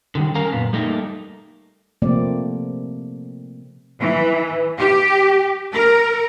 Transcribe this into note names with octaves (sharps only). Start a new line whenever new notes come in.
D3 D#3 G3
C#4 A#4 F5 A#5
F#2 A#2 B3
G3 A3 A#3 D#4
C3 F3 A3 A#3 C4 D5
E3
G4
A#4